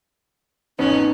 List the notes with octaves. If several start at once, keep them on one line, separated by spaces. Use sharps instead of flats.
A1 F2 B3 C#4 D#4